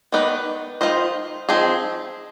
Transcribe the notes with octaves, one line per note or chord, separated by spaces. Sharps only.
D#3 B3 D#4 B4 D5
D#3 B3 F4 C5 D#5
F3 C4 D#4 G#4